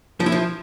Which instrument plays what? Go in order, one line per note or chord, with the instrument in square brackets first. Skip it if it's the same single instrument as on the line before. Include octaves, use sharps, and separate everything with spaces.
[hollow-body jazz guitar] F3
E4
F3